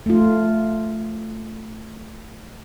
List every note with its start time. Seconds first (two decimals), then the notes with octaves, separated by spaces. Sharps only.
0.06 A3 F4